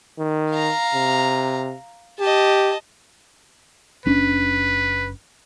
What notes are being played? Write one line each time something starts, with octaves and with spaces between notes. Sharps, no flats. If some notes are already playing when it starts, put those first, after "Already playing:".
D#3
F5 A#5
C3
G4 D#5 A5
F#1 C#4 D4 B4